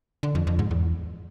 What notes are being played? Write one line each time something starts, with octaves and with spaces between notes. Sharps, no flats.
D3
F2
F2
G#2
E2